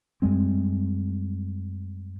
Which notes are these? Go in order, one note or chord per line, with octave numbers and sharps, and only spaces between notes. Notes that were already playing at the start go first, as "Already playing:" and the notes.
F#2 G3 G#3 C4